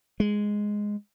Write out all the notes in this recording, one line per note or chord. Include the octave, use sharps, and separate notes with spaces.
G#3